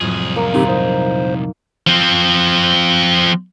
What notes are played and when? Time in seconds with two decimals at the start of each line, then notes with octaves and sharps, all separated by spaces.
0.01 C2 F2 A2 F#3 G#4
0.36 A#3
0.54 D2 A#2 C4 D#4 G4
0.69 D#4 C5
1.87 F3 C4